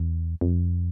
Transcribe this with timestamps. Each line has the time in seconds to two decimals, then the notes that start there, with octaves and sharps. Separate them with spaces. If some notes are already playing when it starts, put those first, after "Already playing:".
Already playing: E2
0.41 F2